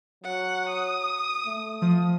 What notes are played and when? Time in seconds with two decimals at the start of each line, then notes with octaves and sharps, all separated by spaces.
0.24 F#3 F#5
0.69 D#6
1.46 A3
1.81 F3 D#6